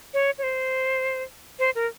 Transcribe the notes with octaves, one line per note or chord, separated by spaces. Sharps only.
C#5
C#5
C5
C5
A#4